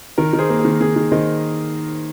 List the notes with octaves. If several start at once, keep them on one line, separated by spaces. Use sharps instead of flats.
D#3 A#4
D#3
G#4 C5
A#3
G#4
D#3
D#3 G#4
D#3
D#3 C5 D#5